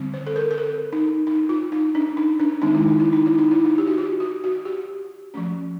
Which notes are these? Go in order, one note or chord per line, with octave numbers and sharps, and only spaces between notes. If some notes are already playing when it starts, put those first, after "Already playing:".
Already playing: D3 G3 C4
C5
A4
A#4
A#4
A4
D#4
D#4
F4
D#4
D4
D#4
D4
D#3 G#3 C4 D#4
E4
D#4
E4
D#4
E4
D#4
E4
D#4
G4
F#4
F4
F#4
F#4
G4
F3 A3 C#4